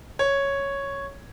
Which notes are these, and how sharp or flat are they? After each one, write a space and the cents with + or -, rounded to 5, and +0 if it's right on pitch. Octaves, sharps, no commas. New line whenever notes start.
C#5 +0